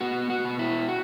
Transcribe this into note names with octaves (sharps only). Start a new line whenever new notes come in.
B3 F#4
F#4
B2
E4
F#4